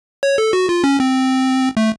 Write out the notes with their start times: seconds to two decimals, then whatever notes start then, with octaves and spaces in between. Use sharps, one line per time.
0.23 C#5
0.38 A4
0.53 F#4
0.69 F4
0.84 C#4
1.00 C4
1.77 A3